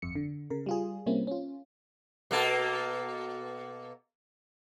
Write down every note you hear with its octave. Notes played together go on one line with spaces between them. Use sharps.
G1 F2 C#7
D3
C#3 A#4
G3 F4 G#4
C3 G3 A#3 C4 C#4 E4
C#4 F4
B2 A#3 A4